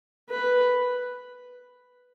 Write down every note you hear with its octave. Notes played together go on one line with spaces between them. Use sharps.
B4